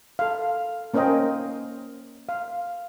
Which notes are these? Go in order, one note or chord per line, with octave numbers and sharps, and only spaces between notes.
A4 F5
A#3 C#4 A#4 C5 D#5 G5
F5